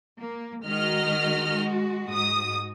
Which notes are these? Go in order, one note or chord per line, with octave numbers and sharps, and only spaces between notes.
A#3
D#3 G#3 F#4 D#5 F6
G#2 D#6